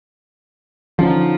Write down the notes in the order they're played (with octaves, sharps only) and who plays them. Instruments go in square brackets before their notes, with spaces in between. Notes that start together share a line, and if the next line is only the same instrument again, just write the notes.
[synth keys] D3 C#4 D#4 [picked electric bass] F3